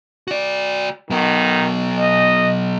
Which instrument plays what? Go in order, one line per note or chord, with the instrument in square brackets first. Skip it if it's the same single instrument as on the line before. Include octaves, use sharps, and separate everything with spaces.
[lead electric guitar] F#4 D5
[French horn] D#3 [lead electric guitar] F#3 B3
[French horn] D#5